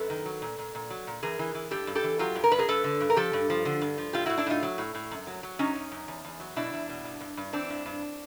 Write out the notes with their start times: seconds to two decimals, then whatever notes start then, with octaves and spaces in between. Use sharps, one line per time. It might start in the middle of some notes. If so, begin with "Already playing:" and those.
Already playing: F#2 A4 B4
0.10 D#3
0.26 F#3
0.42 A#2
0.58 A#2
0.75 A#2
0.90 F#3
1.07 A#2
1.23 E3 G#4 A#4
1.39 E3
1.55 E3
1.71 G2 G4 A4
1.87 G2
1.95 G4 A4
2.04 E3
2.19 F#3 F4 G4
2.35 G2
2.44 A#4
2.52 G2 B4
2.58 G#4 A#4
2.68 G2 A4 B4
2.84 D3
3.01 G2
3.10 A#4
3.16 F3 G4 A4
3.33 G2
3.50 F3
3.65 D3
3.81 G2
3.98 F3
4.13 A2 F4 G4
4.26 E4 F#4
4.30 A2
4.38 D4 E4
4.47 A2 D#4 F4
4.63 F#3
4.78 A2
4.95 A2
5.11 F#2
5.27 F#3
5.43 F#3
5.59 F#2 C#4 D#4
5.75 F#2
5.92 F#2
6.08 E2
6.25 E2
6.40 F#3
6.56 B2 D4 E4
6.73 E2
6.89 B2
7.04 G2
7.20 G2
7.37 G2
7.53 E3 C4 D4
7.70 G2
7.86 G2